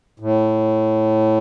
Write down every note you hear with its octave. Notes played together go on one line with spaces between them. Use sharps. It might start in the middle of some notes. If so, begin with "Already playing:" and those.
A2